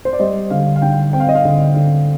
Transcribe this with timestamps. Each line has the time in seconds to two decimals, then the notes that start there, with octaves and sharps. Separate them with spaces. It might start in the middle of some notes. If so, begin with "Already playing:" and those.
0.05 C5
0.13 D5
0.20 G3 D#5
0.50 D3 F5
0.76 F5
0.82 D3 G5
1.13 C4 G5
1.20 F5
1.29 D#5
1.35 F5
1.45 D3
1.76 D3